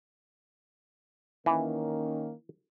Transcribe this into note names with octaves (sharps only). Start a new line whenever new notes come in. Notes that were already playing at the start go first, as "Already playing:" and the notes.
D#3 E3 A#3 C#4